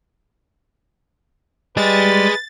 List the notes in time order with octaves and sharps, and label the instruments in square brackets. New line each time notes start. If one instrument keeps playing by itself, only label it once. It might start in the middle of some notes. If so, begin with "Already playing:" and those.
[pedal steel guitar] G3 [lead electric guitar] G#4 D#5 [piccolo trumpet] B4 [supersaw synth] A6